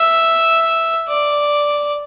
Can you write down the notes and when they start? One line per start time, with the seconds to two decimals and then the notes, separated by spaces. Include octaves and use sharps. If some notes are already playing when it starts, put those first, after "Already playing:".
Already playing: E5
1.08 D5